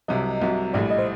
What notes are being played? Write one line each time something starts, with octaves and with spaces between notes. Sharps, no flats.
C2 C3 F#3 D#5
C2 C3 F#3
A#1 A2 G3 D5
D#5
C5